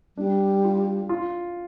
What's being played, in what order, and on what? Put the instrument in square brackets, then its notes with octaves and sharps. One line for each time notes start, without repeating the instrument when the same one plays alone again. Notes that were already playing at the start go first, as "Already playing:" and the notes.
[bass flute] G3 [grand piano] D4
[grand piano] F4
F4